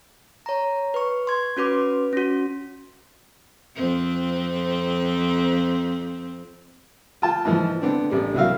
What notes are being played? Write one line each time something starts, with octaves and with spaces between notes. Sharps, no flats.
C#5 A#5
B4 C#6
C6 G#6
C#4 F#4 B4 D6
C#4 F#4
F2 C4
F4 G5 A5
G#2 E3 F3
D3 B3 C4 D4
A1 G3 D4
C2 E3 F#3 F#4 E5 F5